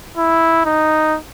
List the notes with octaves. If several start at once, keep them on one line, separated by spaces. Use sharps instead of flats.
E4
D#4